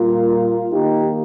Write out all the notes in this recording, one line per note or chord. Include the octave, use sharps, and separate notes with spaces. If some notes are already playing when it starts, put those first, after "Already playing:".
Already playing: A#2 G3 A#3 F4 A#4
D#3 A#3 D#4 G4